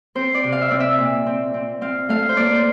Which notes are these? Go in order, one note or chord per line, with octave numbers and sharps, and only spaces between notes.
C4 C5
D5
C3
F5
E5
C4 D5
E5
A#2
C4
C4
C4 F5
A3 F5
C5
A#3 D5
C5